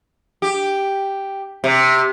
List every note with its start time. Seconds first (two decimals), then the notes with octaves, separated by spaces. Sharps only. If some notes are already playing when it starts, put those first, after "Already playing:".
0.42 G4
1.64 C3